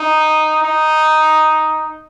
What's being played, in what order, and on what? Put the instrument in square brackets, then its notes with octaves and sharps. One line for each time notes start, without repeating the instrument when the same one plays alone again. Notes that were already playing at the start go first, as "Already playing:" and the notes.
Already playing: [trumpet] D#4
D#4